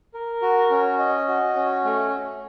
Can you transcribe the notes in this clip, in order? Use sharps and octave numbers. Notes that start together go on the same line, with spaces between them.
A#4
F#4
C#4
D#5
F#4
C#4
A3